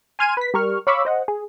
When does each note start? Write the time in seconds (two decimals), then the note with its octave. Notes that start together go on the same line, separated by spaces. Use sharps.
0.19 G#5 C6 F6 G#6 D#7
0.37 B4 B6
0.54 G3 A#4 C#6 F6
0.87 C#5 F5 B5 C#6 D6 E6
1.05 C5 D#5 F#5
1.28 G#4